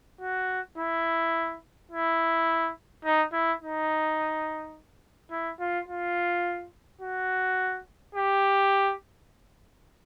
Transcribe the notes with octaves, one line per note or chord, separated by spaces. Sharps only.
F#4
E4
E4
D#4
E4
D#4
E4
F4
F4
F#4
G4